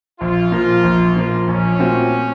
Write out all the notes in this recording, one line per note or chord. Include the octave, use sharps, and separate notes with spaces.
A#1 F4
A#2 F3 A#3
A#1
A#2 F3 A#3
A#1 C#4
A#2 A3 C4 F#4